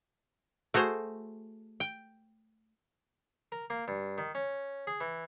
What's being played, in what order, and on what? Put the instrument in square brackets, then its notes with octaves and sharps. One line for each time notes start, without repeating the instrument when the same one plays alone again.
[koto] A3 F#4 G#4 C5
G5
[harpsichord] A#4
A#3
G2
D#3
C#4
G#4
E3